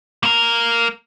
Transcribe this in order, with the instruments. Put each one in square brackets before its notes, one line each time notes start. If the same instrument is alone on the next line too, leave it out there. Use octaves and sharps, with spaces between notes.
[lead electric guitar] A#3 A#4